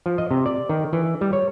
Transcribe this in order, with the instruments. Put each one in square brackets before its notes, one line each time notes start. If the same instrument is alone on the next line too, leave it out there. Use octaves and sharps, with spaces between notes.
[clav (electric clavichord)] F3
D#5
C3
D5
D#3
E3
G3
C#5